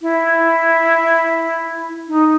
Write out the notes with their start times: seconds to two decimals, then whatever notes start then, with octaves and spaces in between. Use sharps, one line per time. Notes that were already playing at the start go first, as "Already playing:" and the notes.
0.02 E4
2.08 D#4